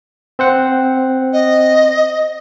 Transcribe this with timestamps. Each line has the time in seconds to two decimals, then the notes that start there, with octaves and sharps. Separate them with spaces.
0.39 C4 C5 F#5
1.33 D#5